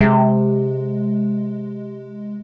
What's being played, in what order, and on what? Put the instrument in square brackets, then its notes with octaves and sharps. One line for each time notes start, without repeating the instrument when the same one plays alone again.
[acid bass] C3 [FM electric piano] G#3